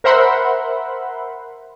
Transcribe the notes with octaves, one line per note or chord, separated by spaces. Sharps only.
A#4 C5 E5 F#5 B5 C6